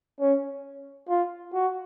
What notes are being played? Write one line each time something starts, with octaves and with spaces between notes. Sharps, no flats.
C#4
F4
F#4